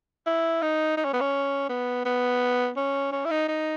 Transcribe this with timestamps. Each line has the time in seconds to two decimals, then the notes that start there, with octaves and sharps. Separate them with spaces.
0.26 E4
0.62 D#4
0.97 D#4
1.05 C#4
1.13 B3
1.21 C#4
1.69 B3
2.05 B3
2.77 C#4
3.12 C#4
3.25 E4
3.30 D#4
3.48 D#4